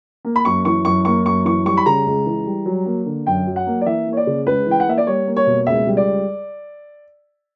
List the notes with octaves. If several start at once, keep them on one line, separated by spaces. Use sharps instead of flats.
A#3
B5
F#2 C#6
E3 C#6
F#2 C#6
A#3 C#6
F#2 C#6
E3 C#6
G3 C#6
B5
C#3 A#5
C#2
E3
G3
F#3
A#3
D3
F#2 G5
F#3
F#5
A#3
D5
E3 E5
A#3
C#5
D5
C#3
C#2 B4
E3 G5
F#5
A#3 E5
D5
G3 C#5
A#3
C#5
B2
C#2 E5
G3
D5